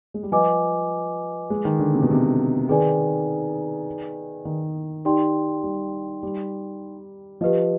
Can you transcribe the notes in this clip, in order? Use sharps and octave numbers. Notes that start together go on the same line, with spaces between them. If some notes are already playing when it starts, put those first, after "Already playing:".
G#3
G3
F3 F4 B4 D#5 G#5 D6
G#3
D#3
D3
C3
B2
C3
D#3 D#4 G#4 B4 D5 G#5
D#3
D#4 G4 D5 G5 C6
G3
G3
F3 G4 B4 D#5